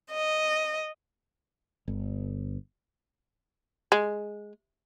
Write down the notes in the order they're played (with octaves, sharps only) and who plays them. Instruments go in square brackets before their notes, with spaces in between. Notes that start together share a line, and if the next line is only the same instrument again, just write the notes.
[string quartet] D#5
[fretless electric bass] G1
[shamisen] G#3